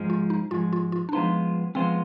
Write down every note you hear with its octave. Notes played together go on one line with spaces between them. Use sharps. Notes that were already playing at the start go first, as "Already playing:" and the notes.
Already playing: G#2 F3 G#3
F4
D#4
G#2 F3 G#3 F4
F4
F4
D4
F3 G#3 B3 D#4 F4 C5
F3 G#3 B3 C4 F4 C5